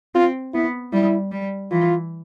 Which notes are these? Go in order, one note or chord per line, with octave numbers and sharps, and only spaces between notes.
C4 F4
B3 E4
G3 E4
G3
E3 F4